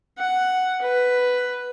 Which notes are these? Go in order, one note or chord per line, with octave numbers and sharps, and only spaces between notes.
F#5
B4